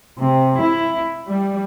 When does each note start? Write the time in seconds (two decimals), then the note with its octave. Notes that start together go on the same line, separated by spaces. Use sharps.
0.18 C3
0.61 E4
1.28 G3